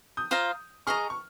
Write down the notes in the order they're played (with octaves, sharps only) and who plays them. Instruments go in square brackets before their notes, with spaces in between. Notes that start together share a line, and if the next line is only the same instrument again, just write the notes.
[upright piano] D#6 G6
[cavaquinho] F4 C5 F5 A#5
[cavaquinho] G#4 D#5 A#5 [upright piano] C#6 F6
[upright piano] C#6